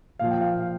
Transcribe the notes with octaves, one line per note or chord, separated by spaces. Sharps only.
A#2 F3 F5
G5
F5
F5